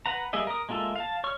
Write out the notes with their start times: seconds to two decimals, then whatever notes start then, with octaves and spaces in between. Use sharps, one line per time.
0.06 B4 F#5 A#5
0.33 G3 A#3 G#4 D#5 E5
0.47 A#4 D#6
0.69 G#3 A#3 F4 A4 E5
0.96 F5 A5
1.24 C#5 C#6 F6